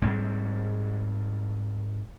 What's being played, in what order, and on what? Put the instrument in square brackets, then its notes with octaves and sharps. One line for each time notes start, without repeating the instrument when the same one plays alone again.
[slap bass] G#2 G3 C4